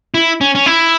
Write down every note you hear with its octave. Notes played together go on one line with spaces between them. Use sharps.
E4
C#4
C#4
E4